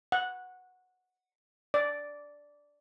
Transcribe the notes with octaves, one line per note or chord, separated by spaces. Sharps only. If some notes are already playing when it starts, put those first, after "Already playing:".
F#5
D5